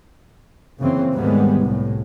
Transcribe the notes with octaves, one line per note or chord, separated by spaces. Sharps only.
F#1 C#3 E3 C4
D#2 G#2 G3 G#3 B3
C2 A2